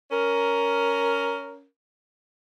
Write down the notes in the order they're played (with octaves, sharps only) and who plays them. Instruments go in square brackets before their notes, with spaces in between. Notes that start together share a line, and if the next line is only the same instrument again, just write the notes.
[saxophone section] C#4 A#4